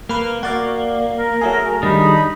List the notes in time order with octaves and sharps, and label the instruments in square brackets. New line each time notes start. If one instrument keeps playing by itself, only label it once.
[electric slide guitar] A#3 [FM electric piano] B4 F6
[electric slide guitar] A#3 [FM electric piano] F#4 D5 F5
[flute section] A#4
[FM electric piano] F#3 A3 G#4
[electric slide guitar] D#3 G3 D4 [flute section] D#4 B5 D#6